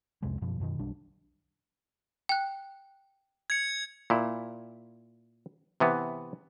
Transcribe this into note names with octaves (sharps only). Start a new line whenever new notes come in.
C2 F2 C3 G#3
F#2 B2 F3
F#2 B2 D#3
B1 G3 D4
G5 F#6
G#6 C#7
A#2 E4
C3 E3 B3